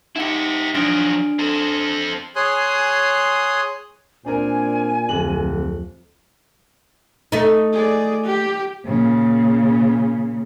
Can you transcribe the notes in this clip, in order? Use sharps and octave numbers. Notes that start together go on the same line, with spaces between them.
D#4 E4 G4 F#5 C#7
F3 F#3 D4 F6 D7
C4 A4
G#4 C#5 G#5 C6 D#6 F#6
A#2 C4 D4 A#4 G#5
D1 F2 F#7
A3 D#4
G#4 D5
G4
A#2 C#3